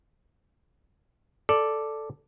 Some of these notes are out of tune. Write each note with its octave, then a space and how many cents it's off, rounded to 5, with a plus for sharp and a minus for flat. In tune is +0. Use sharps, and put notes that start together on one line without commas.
A4 +0 D5 +0